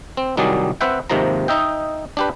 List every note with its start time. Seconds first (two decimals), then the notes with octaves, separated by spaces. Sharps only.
0.17 C4
0.37 C2 D#3 F#3 G3 G#4 D5
0.81 C4 B4 E5 F#5 G5
1.10 D#2 G#2 C3 D#3 F3 A#5
1.48 D#4 D#5 E5 G5
2.17 D4 G4 B4